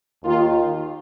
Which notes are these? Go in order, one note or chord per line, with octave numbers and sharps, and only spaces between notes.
D#2 D#3 A#3 F4